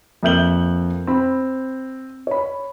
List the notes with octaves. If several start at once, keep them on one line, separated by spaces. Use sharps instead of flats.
F2 A#3 E5 G6 F#7 G7
C4 B5
C#5 B5